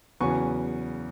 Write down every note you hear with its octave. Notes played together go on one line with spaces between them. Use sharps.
E2 C#3 F#3 B3 G#5 C#6